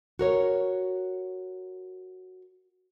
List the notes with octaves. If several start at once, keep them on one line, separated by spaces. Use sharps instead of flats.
F#4 A#4 C#5